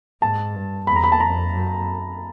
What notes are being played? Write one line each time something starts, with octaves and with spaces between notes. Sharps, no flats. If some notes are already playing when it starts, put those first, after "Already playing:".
G#2 A5
G2
E2 B5
A#5
B5
A5
F2 A#5
F#2